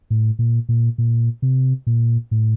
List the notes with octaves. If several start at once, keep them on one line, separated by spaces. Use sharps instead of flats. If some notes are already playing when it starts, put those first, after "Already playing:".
A2
A#2
A#2
A#2
C3
A#2
A2